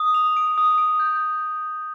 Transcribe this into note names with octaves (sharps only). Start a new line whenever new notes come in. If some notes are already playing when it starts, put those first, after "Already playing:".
Already playing: D#6
F7
D7
D#6
D7
G6